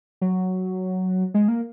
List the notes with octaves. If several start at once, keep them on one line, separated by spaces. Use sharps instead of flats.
F#3
G#3
A#3